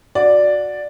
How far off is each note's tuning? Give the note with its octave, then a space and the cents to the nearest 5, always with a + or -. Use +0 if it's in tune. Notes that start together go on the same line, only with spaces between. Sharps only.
F#4 -15 D5 +0